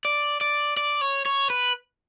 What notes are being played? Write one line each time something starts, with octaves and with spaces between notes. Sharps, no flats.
D5
D5
D5
C#5
C#5
B4